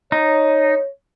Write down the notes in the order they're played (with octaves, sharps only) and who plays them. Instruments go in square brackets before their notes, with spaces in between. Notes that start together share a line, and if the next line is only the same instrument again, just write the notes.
[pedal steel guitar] D#4 [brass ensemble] C#5